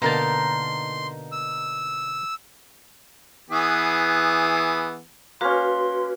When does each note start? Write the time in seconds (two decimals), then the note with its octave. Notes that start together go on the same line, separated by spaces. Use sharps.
0.02 B2 D3 A#3 D#4 A#4 A5 C6
1.32 E6
3.50 E3 B3 G#4
5.41 A#3 C#4 F#4 B4 C6